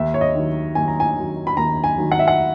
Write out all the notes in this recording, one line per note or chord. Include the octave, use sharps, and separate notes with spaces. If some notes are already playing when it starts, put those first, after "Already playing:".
Already playing: D#2 E5
C#5
D#5
D#3 F#3
D#2 G#5
A#5
G#5
D#3 F#3
B5
D#2 A#5
G#5
D#3 F#3
F#5
E5
F#5